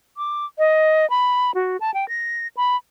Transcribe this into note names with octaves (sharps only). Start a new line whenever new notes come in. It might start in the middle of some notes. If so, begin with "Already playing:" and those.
D6
D#5
B5
F#4
A5
G5
A#6
B5